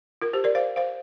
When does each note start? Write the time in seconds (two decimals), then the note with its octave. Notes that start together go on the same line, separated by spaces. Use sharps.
0.22 F4 A#4
0.33 G4 C5
0.44 A#4 D5
0.55 C5 F5
0.76 C5 F5